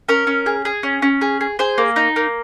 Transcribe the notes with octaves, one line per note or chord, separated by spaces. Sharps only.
C#4 A#4
C#4
G#4
G#4
C#4
C#4
G#4
G#4
G#4 C5
A#3
D#4
A#3